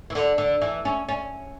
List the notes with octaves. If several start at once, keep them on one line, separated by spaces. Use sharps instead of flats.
E3
D3
D3
E3
C#4
C#4